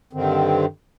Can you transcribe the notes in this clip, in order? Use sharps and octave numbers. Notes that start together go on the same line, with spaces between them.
G2 D3 D#3 C4